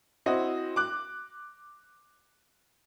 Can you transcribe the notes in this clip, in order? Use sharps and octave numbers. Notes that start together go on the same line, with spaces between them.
C4 E4 F#4 D#5
D6 F#6